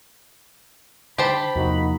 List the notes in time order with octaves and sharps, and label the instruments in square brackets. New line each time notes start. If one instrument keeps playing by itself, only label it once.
[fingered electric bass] D3 [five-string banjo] G4 C5 A5 [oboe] B5
[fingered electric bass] E2 C3 F3 [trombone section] A#3 D#4 F#4